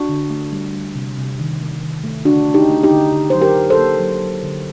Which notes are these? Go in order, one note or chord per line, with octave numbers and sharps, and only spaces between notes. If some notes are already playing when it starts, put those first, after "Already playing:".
Already playing: D4 F#4
D3
A3
G3
G3
C3
C3
D#3
A3
D#3
A3
D3 D4 F#4
A3
D#4 G4
A3
D#4 G4
D3
D3
F#3 C5
G4 A#4
D3
A4 C5
A#3
F#3
F#3
D3